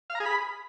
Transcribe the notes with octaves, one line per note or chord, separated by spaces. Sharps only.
F5
A#5
G#4
B5